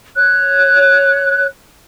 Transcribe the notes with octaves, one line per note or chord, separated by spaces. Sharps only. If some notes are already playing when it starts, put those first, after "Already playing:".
C#5 F#6